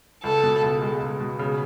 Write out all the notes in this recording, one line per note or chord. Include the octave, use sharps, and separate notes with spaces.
C#2 A4
B2
C#2
G#3
C#2
B2
C#3